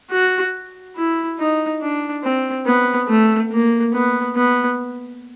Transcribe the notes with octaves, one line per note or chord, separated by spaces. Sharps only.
F#4
E4
D#4
D4
C4
B3
A3
A#3
B3
B3